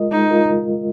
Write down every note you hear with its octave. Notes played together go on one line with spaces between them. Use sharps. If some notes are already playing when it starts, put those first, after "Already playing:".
Already playing: G#3 F4 A#4 D#5
G#3 D#4
F4 A#4 D#5